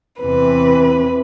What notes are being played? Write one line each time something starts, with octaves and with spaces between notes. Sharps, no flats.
E2 C3 E3 B4